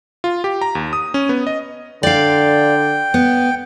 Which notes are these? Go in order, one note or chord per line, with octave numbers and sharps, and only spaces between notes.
F4
G4
A#5
D#2
D#6
C#4
B3
D#5
D3 D5 F5 G5
B3